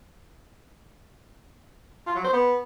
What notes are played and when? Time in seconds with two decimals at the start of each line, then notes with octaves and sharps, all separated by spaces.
2.07 F4
2.16 F#3
2.24 C5
2.33 B3